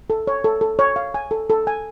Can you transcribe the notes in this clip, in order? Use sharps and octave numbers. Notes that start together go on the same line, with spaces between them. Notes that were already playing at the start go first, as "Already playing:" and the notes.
A4
C#5
A4
A4
C#5
F5
G#5
A4
A4
G#5